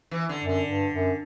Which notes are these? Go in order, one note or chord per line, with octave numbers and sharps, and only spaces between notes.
E3
D3
F#2
D3
G2
F#2